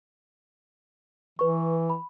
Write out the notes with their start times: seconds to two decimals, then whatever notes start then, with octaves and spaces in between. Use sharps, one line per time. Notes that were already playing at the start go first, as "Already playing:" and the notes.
1.39 E3 B4 C#6
1.90 B5